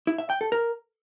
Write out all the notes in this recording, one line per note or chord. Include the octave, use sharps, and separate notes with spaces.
E4
E5
G5
A4
A#4